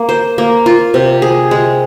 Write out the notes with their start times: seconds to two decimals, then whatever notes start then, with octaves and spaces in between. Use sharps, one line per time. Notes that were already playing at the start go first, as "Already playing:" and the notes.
Already playing: A#3
0.09 C5
0.38 A#3
0.66 F4
0.94 C3
1.22 G#4
1.51 G#3